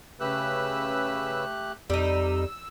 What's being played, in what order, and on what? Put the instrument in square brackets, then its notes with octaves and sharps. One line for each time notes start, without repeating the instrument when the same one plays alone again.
[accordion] C#3 B4 E6 [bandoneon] A3 G4 F#6
[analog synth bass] F2 [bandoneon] C3 [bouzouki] G3 D#4 [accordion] E6